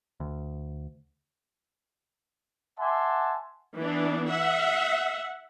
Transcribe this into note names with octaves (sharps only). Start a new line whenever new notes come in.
D2
E5 F#5 G#5 A5 C6 D6
E3 B3 D4
E5 F#5